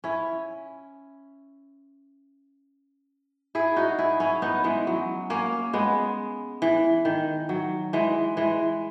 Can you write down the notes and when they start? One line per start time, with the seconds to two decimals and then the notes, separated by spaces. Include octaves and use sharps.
0.04 C#4 E4
3.55 E4 G#4
3.76 D#4 F#4
3.99 E4 G#4
4.20 C#4 E4
4.42 B3 D#4
4.64 E3 G#3
4.87 F#3
5.30 A#3 C#4
5.73 G#3 B3
6.62 E3
7.05 D#3
7.49 F#3
7.93 E3 G#3
8.37 E3 G#3